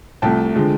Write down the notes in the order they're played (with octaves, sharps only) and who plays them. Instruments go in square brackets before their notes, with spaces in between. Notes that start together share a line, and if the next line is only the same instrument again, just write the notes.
[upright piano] C2 C3 F3 A3 G5 A5
D3 F3 G#3